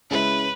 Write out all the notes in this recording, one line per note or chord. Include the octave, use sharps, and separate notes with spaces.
C#3 G#3 E4 B4